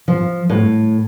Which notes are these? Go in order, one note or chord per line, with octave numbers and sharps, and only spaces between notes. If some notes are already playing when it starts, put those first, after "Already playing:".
F3
A2